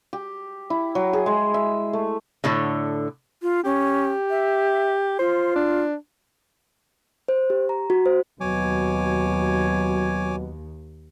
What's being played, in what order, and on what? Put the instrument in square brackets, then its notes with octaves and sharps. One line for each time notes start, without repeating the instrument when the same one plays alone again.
[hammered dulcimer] G4
E4
F#3
G#4
G#3
E5
A3
[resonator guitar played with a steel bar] A2 D3 A4 C#5
[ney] F4
[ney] C#4 [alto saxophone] G4
[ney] E5
[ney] F4 [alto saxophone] C5
[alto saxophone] D4
[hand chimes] C5
G4
A#5
F#4
C5
[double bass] D#2 [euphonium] B2 [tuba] F#3 [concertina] C#5 G#5 D6